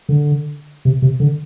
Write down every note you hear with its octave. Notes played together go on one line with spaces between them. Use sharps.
D3
C3
C3
D3